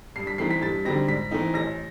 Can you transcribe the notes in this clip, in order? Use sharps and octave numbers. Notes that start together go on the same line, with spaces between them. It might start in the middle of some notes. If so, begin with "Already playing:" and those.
G2 C7
B6
E3 A3 C4 D#4 C7
B6
G2 A6
D3 G3 C4 D#4 A#6
G#2 B6
E3 A3 C4 D#4
A1 A#6